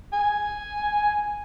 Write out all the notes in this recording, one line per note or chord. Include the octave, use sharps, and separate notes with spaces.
G#5